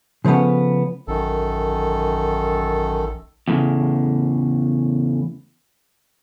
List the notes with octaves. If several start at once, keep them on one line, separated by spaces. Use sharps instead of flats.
C#3 F3 A3 B3 C#4
A1 F#2 D#3 A4
E2 A2 C#3